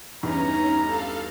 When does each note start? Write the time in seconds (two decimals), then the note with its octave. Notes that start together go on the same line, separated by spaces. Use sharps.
0.23 E2 G2 E3 C#4 D#4 A#5
0.86 A4 F5